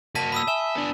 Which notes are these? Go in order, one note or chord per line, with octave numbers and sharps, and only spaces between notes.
A#3 F#4 A5 B6 D#7
B5 D#6 E6
E5 G#5 E7 G7
B3 D4